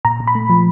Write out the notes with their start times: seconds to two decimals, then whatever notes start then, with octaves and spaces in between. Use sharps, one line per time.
0.05 A#2 A#5
0.20 A#2
0.27 B5
0.35 A3
0.50 F3